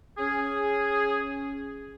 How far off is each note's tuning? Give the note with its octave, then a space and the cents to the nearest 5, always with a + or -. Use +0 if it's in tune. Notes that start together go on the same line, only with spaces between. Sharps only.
C#4 +0 G#4 +0